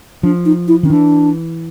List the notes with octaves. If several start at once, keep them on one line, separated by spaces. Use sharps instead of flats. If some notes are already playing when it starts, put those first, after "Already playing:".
F3 D4
D#4
E4
D#3 C#4
E3 D4